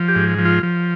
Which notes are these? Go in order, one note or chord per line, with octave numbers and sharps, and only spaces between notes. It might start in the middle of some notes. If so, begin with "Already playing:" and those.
Already playing: F3
G4
G#2
F3
F4
F3